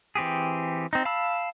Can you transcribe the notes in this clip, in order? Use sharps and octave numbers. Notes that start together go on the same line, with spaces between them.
E3 C4 G4 G#4
C4 D#4
F5 A5 B5 E6